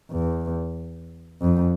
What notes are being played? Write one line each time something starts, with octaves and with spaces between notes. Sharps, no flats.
E2
F2